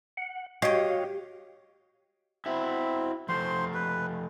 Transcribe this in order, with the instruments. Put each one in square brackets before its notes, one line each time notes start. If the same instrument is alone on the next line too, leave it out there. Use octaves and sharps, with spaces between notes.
[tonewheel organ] F#5
[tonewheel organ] F#4 C#5 F5 [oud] G4 [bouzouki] D#5 G5
[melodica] C4 [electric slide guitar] E4 F#4 E5
[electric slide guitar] F3 A3 [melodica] C5 C6
[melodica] B4